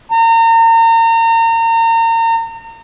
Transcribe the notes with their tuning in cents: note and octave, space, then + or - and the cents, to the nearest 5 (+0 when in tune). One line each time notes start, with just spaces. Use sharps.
A#5 -35